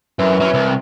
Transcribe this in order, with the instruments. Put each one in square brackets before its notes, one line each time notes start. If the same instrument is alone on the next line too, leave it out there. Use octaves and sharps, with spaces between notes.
[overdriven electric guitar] F#2 [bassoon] E3
[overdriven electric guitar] F#3 C#4
C2